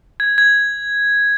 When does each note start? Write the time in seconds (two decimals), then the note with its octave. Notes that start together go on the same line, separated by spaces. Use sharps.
0.20 G#6
0.38 G#6